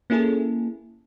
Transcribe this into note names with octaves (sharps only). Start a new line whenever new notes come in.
A#3 C#4 E4 G#4 A4